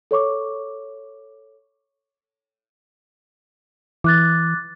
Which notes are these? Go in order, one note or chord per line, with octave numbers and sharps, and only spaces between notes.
A4 C#5 C#6 D6
E3 D6 F#6 A6